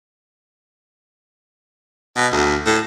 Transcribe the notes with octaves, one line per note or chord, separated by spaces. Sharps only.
B2
D2
A2